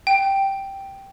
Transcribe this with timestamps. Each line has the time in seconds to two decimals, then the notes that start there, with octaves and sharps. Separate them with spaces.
0.07 G5